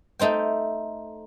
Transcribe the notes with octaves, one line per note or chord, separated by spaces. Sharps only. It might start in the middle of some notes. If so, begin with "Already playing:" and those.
A3 D#4 C5 G5